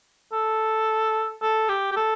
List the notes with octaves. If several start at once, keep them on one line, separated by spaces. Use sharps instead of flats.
A4
A4
G4
G4
A4